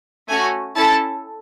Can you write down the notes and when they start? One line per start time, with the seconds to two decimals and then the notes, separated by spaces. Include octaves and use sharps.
0.29 A3 C#4 F#4 G#5
0.76 C#4 E4 A4 A5